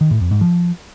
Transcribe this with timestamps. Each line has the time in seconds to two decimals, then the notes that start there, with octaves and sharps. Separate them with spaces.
0.01 D#3
0.11 A2
0.21 F2
0.31 G#2
0.41 F3